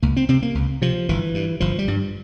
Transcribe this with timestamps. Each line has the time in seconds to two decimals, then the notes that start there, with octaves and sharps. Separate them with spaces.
0.02 C#2 A#3
0.16 C4
0.29 C3 C4
0.42 A#3
0.55 C#2
0.82 C3 F3
1.09 G1 E3
1.34 G2
1.60 G1 F3
1.79 G3
1.88 G2